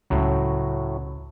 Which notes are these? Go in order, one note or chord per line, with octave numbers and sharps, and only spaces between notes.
C#2 A2 C#3 F#3